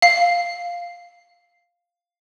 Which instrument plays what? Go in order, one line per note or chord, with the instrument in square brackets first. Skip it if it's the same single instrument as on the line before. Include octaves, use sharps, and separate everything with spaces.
[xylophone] F5 C7